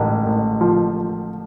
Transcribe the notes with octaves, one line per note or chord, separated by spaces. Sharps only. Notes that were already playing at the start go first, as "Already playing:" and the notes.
Already playing: A1 G#2
A1
F3